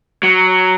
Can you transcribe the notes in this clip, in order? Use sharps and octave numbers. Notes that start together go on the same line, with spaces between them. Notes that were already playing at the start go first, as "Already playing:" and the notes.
F#3